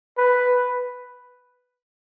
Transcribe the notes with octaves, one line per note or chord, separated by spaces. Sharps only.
B4